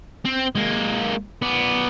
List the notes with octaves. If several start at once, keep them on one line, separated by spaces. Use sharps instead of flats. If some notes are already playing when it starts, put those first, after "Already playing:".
C4
G#3 A#3
B3 D5